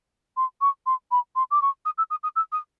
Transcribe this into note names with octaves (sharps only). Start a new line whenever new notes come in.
C6
C#6
C6
B5
C6
D6
C#6
D#6
E6
D#6
D#6
E6
D#6